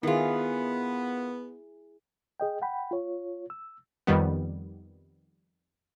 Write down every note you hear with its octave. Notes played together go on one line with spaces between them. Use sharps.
D#3 B3 E4 F4 G#4
G#4 D#5 G5
F#5 G5 B5
F4 C#5
E6
F2 D#3 G3 B3